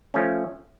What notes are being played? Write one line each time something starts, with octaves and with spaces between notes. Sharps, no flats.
F3 A3 C#4